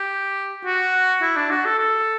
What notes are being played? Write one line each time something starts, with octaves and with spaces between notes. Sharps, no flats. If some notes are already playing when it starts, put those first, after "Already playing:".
Already playing: G4
F#4
E4
D4
F#4
A4
A4